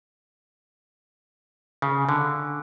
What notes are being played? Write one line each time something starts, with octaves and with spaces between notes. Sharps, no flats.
C#3
D3